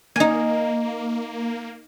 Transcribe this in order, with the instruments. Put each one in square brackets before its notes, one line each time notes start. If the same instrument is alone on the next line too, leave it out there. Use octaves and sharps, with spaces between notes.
[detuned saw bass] A#3 [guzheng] D#4 G#5